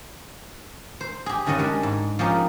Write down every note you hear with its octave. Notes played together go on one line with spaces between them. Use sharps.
C5
G4 G#4
G2 D#3 G3 C#4 D#5 F#5
G3 G#3 D4
G#2
F3 A#3 C#4 D#4 G4